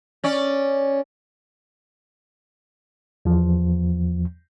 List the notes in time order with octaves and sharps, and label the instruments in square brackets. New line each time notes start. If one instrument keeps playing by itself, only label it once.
[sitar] C#4 D5
[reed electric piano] E2 F3